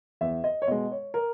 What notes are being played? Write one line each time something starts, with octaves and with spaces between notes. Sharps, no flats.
E2 E5
D#5
C#5
B2 G#3 D#5
C#5
A#4